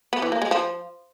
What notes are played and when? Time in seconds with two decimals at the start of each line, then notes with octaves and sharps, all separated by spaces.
0.13 B3
0.22 E3
0.32 A#3
0.42 G#3
0.51 F3